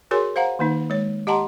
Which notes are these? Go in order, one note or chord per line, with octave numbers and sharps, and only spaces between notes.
F#4 G#4 A#4 C#5 G#5 C6
C5 F5 F#5 A#5
D#3 A#3 D#4
G#3 C#5
G4 D#5 F#5 A5 A#5 C6